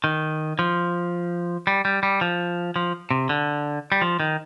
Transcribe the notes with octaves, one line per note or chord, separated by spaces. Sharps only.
D#3
F3
G3
G3
G3
F3
F3
C3
D3
G3
F3
D#3